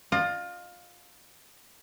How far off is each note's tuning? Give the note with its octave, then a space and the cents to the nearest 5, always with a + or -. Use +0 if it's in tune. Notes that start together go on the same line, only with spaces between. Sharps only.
F4 +20 D#5 -35